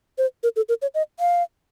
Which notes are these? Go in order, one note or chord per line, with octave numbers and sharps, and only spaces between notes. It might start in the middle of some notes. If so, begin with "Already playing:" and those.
C5
A#4
A4
A#4
C#5
D#5
F5